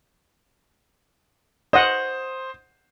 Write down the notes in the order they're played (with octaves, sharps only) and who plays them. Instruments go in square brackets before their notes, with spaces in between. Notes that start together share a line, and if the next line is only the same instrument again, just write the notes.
[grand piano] C5 D#6 [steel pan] D#5 F#5